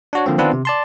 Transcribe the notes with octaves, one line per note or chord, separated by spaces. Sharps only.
D4 F#4 C#5
D3 F3 A#3 C4
D#3 B3 C4 D4 F4 B4
C3
D5 A5 C6